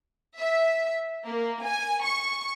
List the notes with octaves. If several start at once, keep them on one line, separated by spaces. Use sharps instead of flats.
E5
A#3
G#5
C#6